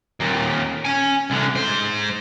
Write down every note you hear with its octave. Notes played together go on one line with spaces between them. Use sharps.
D#2 A#2
C#4 G#5
C2 D3
G#2 C5